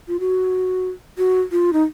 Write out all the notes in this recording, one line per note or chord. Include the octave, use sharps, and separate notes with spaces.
F4
F#4
F#4
F4
D#4